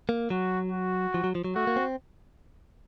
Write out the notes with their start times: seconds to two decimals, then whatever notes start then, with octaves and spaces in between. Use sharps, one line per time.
0.09 A#3
0.30 F#3 F#4
0.72 F#4
1.14 F3
1.24 F#3
1.35 F3
1.44 F#3
1.56 A3 F#4
1.67 A#3
1.76 C4